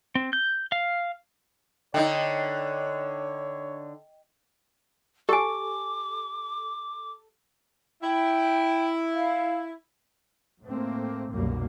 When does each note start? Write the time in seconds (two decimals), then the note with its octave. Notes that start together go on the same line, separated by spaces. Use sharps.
0.15 C4
0.33 G6
0.72 F5
1.94 D3 D#4 C#5 D#5 G5
5.29 G4 A4 G#5 D6
8.03 E4 G5
9.14 F5
10.62 A2 A3 A#3 C4
11.32 F1 C2 F#2 B2 G3 A#3